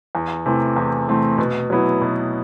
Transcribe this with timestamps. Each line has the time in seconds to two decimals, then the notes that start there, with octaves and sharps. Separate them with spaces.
0.15 E2
0.46 C3 E3 A3 C4
0.76 E2
1.08 C3 E3 A3 C4
1.38 B2
1.70 F#3 B3 E4
2.01 B2